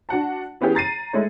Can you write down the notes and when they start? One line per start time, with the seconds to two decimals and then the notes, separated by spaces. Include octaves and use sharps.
0.09 D4 F#4 F#5 A5
0.61 E3 B3 C#4 G4 G#4
0.75 A#5 A6 C7 D#7
1.13 G#3 A3 C#5